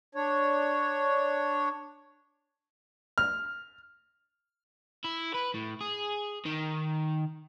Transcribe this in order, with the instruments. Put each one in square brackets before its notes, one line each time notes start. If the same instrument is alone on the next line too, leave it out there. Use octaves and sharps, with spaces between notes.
[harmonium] D4 C#5
[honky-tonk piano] F6
[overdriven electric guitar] E4
B4
A2
G#4
D#3